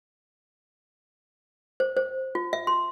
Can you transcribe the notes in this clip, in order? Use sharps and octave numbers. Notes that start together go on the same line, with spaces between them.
C5
C5
F4
E5
C6